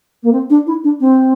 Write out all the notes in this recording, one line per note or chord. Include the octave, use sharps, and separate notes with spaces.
A#3
C4
D4
E4
D4
C4